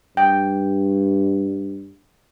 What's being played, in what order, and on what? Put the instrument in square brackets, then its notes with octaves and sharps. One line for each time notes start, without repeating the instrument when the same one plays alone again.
[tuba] G2 [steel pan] G5